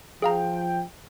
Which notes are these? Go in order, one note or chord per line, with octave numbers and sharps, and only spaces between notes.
F3 G#4 F5 G5 A#5